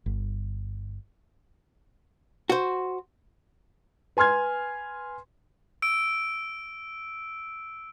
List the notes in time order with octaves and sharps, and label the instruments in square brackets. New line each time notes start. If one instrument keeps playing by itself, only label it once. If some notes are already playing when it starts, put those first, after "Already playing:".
[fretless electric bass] G1
[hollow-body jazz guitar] F#4 C5
[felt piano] B4 G#5 C6 F6 G#6
[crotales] E6 D7